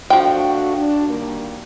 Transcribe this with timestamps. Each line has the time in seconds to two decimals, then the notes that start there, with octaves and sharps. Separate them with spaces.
0.10 F3 A3 D4 F#4 G5
0.76 D4
1.08 D#3 G3 A#3